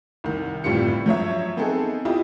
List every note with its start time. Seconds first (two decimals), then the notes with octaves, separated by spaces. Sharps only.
0.24 C2 D#3
0.64 G1 A2 G3 C4 F4 C#7
1.06 F3 F#3 C#5 E5
1.57 B3 C4 D#4 G#4 A4
2.05 E4 F4 G4 D#5 E5